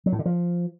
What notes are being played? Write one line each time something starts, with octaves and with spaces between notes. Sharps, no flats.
F#3
A2
D3
F3